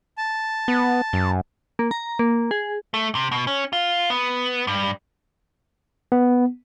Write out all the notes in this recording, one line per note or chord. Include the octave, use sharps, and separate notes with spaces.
A5
B3
F#2
A#3
A#5
A#3
G#4
A3
C3
B2
C#4
F4
B3
G2
B3